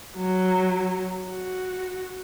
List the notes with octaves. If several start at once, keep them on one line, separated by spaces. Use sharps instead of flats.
F#3
F#4